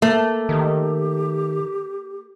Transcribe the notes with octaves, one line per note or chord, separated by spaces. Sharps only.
A3 A#3
D#3 G4